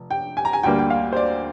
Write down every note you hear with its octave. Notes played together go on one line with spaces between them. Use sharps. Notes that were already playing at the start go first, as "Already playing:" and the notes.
Already playing: F1
G5
G#5
A#5
G#5
D2 D3 G3 A#3 G5
G5
F5
C5
D5